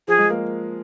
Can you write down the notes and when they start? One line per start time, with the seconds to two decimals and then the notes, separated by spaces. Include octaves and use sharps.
0.08 F3 G#4
0.19 G#3
0.30 A#3